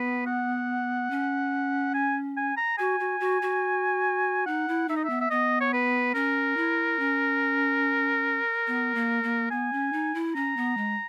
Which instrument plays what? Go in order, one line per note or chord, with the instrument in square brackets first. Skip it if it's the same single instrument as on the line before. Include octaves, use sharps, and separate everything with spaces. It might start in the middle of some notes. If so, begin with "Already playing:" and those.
Already playing: [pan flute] B3 [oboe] B4
[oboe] F#5
[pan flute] C#4
[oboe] G#5
G#5
A#5
[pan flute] F#4 [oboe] G#5
[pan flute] F#4
F#4
F#4
[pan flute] D#4 [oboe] F#5
[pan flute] E4
[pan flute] D#4 [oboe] E5
[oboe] D#5
E5
[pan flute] B3
[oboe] E5
[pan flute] B3 [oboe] D#5
[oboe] C#5
B4
[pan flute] C#4 [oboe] A#4
[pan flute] E4
C#4
B3
A#3
A#3
[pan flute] B3 [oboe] G#5
[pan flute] C#4
D#4
E4
[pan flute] C#4 [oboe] A#5
[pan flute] B3
G#3